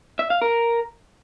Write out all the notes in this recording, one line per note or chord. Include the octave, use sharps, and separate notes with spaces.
E5
F5
A#4